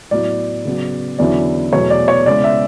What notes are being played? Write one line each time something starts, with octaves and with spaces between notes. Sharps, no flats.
A2 F#3 B3 E4 D5
C#3 F#3 B3
E2 D3 F#3 C#4 E4 D5
E2 B2 F#3 A3 C#5
D5
C#5
C#3 G#3 B3 E4 D5
E5